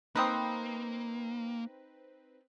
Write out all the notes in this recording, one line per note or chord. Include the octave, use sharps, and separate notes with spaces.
A#3 C4 D#4 B4 D#6